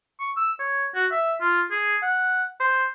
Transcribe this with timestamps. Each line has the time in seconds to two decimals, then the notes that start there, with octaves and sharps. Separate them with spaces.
0.20 C#6
0.37 E6
0.60 C#5
0.95 F#4
1.11 E5
1.41 F4
1.71 G#4
2.02 F#5
2.60 C5